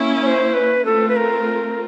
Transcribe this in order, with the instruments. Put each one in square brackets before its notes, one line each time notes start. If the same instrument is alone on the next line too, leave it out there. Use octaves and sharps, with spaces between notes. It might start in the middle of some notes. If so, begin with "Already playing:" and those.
Already playing: [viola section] A#3 C#4 E4
[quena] C#5
C5
B4
[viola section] A3 C4 F4 [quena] A4
[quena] B4
A#4